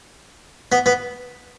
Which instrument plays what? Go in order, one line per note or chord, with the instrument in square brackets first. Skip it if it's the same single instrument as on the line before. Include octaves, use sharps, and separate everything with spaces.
[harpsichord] B3
B3